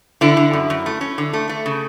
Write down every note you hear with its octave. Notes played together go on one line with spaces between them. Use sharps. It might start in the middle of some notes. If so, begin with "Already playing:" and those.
D3 E4
D3
F#2
F#2
A3
C#4
D3
A3
A3
C#3